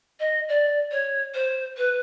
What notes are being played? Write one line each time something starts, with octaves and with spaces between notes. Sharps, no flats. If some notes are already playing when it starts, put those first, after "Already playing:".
D#5
D5
C#5
C5
B4